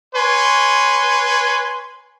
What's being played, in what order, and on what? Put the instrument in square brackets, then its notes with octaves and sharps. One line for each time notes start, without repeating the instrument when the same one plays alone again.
[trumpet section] B4 C#5 G#5 C6